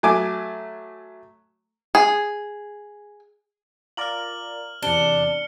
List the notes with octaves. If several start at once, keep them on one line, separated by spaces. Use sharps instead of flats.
F#3 A3 G#5 D6
G#4
F4 A#4 D5 F6 F#7
E2 C3 D4 C#7 G7